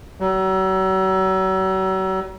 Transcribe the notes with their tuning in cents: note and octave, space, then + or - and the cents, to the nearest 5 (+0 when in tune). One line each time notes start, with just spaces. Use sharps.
F#3 +40